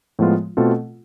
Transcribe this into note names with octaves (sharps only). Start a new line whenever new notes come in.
A2 F3 G#3 B3 F4
B2 A3 C4 F4 A4